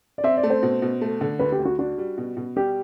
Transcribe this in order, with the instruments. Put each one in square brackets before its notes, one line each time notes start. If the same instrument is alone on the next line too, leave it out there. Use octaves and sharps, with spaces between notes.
[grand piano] D5
[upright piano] C4 [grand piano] E5
[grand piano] D5
[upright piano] A3
[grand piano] C5
[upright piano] B2
B2
A3
D3
[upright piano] D2 [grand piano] B4
[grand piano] G4
[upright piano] D2
[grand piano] F#4
[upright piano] D4 [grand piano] F#4
[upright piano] G3
B2
B2
[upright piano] G3 [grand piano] G4